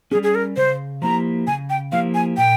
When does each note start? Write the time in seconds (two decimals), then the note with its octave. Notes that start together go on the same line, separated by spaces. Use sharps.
0.11 G3 C#4 G#4
0.23 G#4
0.35 A#4
0.57 C#3 C5
1.02 F3 A#3 E4 G4 A#5
1.47 C#3 G#5
1.70 G5
1.92 F3 A#3 E4 G4 F5
2.14 G#5
2.37 A#2 G5